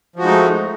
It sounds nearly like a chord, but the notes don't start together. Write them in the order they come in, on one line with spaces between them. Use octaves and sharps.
F3 F#4 G#3 D#4 A3